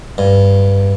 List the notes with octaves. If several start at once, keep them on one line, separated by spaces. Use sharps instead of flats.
G2